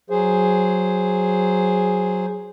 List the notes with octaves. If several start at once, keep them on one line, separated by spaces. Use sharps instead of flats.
F#3 G#4 C5